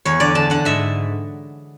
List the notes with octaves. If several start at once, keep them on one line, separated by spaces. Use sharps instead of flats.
E2 C#5
D3 D5
D3 A5
D3 F#5
G#2 E5